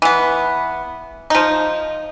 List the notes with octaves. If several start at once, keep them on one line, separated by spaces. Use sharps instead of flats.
E3 B3
F3 D#4